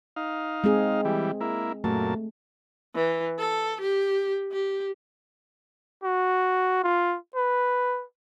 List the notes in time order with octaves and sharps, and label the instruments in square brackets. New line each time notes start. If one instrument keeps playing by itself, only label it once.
[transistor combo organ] D#4 F5
[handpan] G#3 C4 G#4
[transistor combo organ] E3 G3
A#3 E4
[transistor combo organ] F#2 A#2 A5 [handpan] A3
[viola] E3
A4
G4
G4
[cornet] F#4
F4
B4